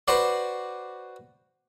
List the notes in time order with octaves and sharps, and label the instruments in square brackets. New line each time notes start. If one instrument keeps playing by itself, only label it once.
[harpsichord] F#4 B4 C5 D5